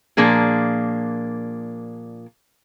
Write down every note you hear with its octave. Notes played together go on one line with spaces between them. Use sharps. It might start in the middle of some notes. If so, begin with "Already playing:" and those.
A#2 F3 A#3 D4 G#4